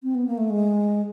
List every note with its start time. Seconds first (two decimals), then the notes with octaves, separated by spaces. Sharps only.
0.03 C4
0.15 B3
0.27 A#3
0.38 A3
0.50 G#3